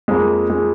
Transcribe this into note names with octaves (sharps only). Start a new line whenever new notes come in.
F2 F3 G#3 A#3
G#3